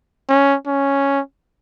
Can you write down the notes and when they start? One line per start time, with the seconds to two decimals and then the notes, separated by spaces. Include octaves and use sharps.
0.29 C#4
0.67 C#4